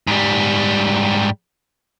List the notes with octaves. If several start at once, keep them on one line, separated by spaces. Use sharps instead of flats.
G#2 G3